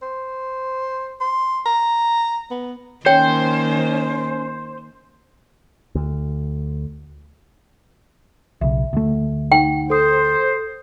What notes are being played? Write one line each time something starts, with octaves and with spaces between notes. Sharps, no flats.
C5
C6
A#5
B3
D#3 A#3 C#4 C5 C#5 G5
D2
B1 C#3 E5
D2 A3
D#4 F#5 G5
A4 C5 D#6